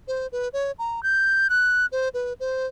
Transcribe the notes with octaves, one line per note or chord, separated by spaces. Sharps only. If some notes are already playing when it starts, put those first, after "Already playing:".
C5
B4
C#5
A#5
G6
F#6
C5
B4
C5